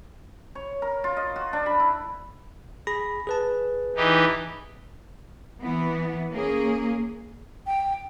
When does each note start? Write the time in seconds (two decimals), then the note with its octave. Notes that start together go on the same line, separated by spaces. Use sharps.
0.55 C#5
0.82 A#4
1.04 F4
1.17 D#5
1.36 F#4
1.53 D4
1.66 B5
1.80 E4
2.87 G#4 B5 A#6
3.27 G#4 B4 A5
3.96 E3 D#4 G4
5.61 E3 B3
6.32 A#3 C#4 G#4
7.66 G5